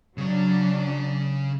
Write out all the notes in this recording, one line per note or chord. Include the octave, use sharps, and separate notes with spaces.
C#3 F#3 D4 C#5